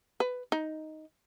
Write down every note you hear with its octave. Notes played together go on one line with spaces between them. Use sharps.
B4
D#4